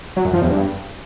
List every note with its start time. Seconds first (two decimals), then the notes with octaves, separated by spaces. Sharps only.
0.17 F#3
0.25 F#2
0.33 F3
0.42 E2
0.50 G2